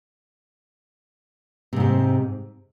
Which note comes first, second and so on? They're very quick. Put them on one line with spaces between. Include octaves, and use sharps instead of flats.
C3 G#2 C4